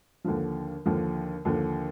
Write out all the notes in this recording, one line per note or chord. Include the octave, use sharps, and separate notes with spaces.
D#2 D3 F3
D#2 D3 F3
D#2 D3 F3